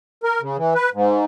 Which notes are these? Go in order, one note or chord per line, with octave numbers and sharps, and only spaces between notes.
A#4
C#3
E3
B4
G#2